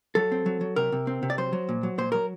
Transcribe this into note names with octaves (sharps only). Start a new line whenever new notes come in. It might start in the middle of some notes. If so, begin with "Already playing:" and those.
F#3 A4
C4
F#3
F#3
C3 A#4
C3
C4
C3
D5
F#3 C5
F#3
A#2
F#3
A#2 C5
F#3 A#4